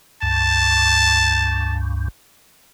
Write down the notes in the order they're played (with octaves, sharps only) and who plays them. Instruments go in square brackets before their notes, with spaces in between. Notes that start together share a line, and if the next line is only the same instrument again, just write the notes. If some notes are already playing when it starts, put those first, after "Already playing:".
[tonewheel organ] C#2 G2 [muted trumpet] A5